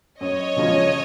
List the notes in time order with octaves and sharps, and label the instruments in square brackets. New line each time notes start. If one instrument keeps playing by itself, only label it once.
[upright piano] F#2 [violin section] C#5 D#5
[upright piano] C#3 F3 G#3 C#4